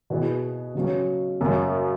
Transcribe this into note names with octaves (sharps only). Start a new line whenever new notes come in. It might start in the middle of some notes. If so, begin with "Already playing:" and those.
B2 B3 E4 G#4
C#3 F#3 C#4
F#2 C#3 G#3 C#4